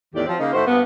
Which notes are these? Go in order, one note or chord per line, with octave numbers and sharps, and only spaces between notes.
E2 A2 D#3 G4 D5
F3 F#3 C4
C#3 A#3 D#4
A2 D#3 F#4 C5
G2 A#3 B3